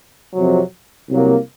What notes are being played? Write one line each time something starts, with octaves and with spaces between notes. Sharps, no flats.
F2 C3 F#3
C2 C3 F#3 A#3